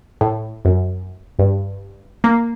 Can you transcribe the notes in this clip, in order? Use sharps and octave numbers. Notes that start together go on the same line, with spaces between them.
A2
F#2
G2
A#3